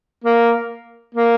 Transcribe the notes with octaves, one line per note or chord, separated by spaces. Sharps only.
A#3
A#3